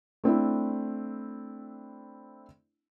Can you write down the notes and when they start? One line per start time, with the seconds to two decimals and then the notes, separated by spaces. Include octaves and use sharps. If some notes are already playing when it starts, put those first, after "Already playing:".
0.24 A3 C4 D4 E4